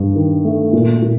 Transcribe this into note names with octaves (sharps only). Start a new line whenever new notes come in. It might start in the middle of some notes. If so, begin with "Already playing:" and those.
Already playing: G2
D#3
A3
A#2
A#2